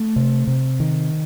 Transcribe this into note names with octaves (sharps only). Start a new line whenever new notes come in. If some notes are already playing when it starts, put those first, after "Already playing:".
Already playing: A3
C3
C3
D#3